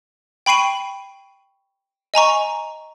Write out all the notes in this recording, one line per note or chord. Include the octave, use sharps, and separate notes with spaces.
G5 B5 C#6 C7 D#7
D#5 G#5 A#5 C#6